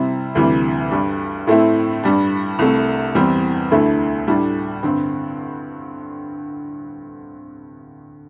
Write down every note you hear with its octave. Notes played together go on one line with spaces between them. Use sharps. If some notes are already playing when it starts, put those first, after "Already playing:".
Already playing: C3 G3 C4 E4
D2 C3 E3 G3
G2 G3 D4
A2 A3 C4 E4
G2 G3 D4
C2 C3 A3
E2 E3 G3 C4
D2 D3 A3 E4
A2 G3 D4
G2 D3 C4